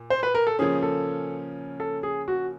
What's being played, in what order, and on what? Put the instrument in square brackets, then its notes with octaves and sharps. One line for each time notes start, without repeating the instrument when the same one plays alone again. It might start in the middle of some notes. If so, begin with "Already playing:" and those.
Already playing: [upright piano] A#2
[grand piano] C5
B4
A#4
A4
[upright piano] C#3 F3 A#3 C#4 [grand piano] G#4
[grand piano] A4
A4
G#4
F#4